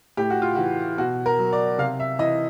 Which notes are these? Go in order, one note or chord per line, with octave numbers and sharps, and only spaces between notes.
A2 G4
F#4
F4
E3 F#4
B2 F#4
A#4
F#3
D5
C3 F5
E5
E3 D#5